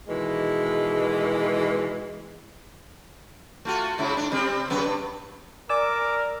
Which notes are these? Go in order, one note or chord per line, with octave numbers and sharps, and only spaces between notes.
B2 D#3 E3 G#3
A3 F4 F#4
G#2 C#3 E4
G#2 D4
C3 G3 C4
F#2 C#3 B3
G2
A#4 D5 G#5 D6 E6